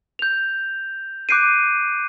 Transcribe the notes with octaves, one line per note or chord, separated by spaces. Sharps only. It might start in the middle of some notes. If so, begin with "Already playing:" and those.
G6 F7
D6 F#6 G6 C7 D7 D#7